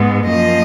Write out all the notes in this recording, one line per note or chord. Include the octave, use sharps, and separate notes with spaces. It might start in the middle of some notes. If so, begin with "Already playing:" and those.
Already playing: G#2 B3
F#2 F3 A#3 D#5